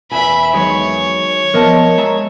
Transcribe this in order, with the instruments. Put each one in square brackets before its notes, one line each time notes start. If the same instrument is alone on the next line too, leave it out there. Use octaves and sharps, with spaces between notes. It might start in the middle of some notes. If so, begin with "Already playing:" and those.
[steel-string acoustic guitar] E2 G#5 [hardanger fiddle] E5 B5
[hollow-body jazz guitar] D#3 F#3 G#3 [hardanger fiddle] C#5
[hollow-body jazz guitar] F3 B3 [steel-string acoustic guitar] A#4 D#5 A5
[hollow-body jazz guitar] G#3 E5 A#5